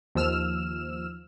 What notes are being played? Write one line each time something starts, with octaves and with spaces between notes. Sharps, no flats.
D#2 F3 E6 F6 E7